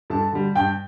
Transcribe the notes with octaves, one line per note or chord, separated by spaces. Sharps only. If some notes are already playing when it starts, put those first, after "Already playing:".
G2 A4 A5
D3 G3
G2 G5 G6